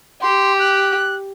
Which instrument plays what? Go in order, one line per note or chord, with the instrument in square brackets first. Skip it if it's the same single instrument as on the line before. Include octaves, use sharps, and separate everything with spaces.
[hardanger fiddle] G4 [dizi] C6
[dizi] F#6